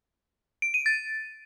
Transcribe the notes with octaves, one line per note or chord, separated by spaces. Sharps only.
D7
D#7
A6